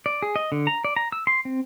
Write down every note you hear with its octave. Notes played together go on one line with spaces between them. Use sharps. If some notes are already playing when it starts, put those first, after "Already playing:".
D5
G#4
D#5
D3
A#5
D5
A#5
E6
C6
C4